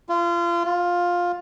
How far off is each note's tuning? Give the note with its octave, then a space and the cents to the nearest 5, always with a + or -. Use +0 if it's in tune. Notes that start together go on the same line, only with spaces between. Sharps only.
F4 -30
F4 +10